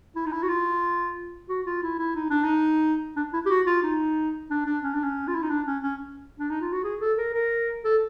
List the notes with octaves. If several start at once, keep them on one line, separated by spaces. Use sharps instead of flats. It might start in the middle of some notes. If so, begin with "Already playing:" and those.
E4
D#4
E4
F#4
F4
F#4
F4
E4
E4
D#4
D4
D#4
D4
E4
G4
F#4
F4
D#4
D4
D4
C#4
D4
C#4
F4
E4
D#4
D4
C#4
C#4
D4
D#4
F4
F#4
G#4
A4
A#4
A#4
A4